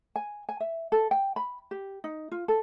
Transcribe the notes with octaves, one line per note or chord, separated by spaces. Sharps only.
G#5
G#5
E5
A4
G5
B5
G4
D#4
F4
A4